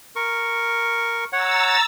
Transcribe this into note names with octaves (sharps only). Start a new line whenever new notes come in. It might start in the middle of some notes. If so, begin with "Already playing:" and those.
A#4 C#6
C#5 F#5 A#5 E6 A6